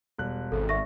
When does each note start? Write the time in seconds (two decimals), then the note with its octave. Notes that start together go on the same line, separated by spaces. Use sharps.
0.18 E1 G3 F#6
0.52 G#1 A4
0.69 D5 E5 C#6 A#6